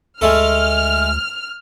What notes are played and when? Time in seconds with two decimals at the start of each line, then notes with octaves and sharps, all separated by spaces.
0.21 D2 G#3 A3 A4 F6